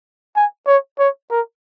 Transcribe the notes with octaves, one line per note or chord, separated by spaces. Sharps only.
G#5
C#5
C#5
A#4